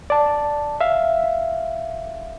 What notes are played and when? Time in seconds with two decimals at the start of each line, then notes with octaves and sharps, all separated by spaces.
0.10 D5 A5
0.80 E5 F5